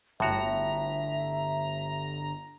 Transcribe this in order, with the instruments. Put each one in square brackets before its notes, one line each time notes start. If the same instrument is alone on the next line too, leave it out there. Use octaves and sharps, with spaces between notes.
[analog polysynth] G1 A#5 [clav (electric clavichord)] A2 F#4 [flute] E5